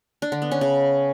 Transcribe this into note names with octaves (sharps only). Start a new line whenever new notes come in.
D4
D3
B3
C#4
C#3